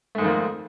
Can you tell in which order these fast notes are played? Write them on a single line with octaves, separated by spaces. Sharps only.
A3 G#2 D#3 F2 A#3